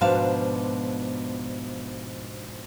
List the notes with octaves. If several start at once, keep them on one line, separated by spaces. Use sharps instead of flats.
G#2 B2 F3 D4 F5 A5